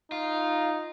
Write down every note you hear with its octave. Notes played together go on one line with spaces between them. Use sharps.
D#4 F4